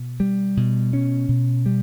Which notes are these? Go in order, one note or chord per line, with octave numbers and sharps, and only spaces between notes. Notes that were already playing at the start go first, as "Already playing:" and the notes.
Already playing: B2
G3
B2
C#4
B2
G3